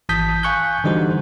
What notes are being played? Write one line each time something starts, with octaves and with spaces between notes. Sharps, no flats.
G#1 E3 A5 D#6 G6 B6
F5 G#5 C#6 F#6 G6
D3 E3 G3 D#4 F#4 C5